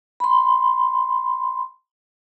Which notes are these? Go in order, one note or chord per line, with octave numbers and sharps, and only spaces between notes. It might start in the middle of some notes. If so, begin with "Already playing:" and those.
B5 C6